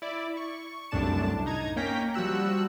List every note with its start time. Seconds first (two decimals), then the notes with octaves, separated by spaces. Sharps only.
0.02 E4 D5
0.37 C#6
0.91 C2 F#2 A2 D4 A5 E7
1.46 D#4 A#5 G#6
1.76 A#3 C#4 G5 A#5 B6
2.14 F3 G3 F#4 E6 F#6